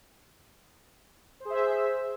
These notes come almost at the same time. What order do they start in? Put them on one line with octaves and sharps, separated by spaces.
C5 G#4 E5